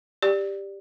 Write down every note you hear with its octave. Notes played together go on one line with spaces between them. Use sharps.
G4 D5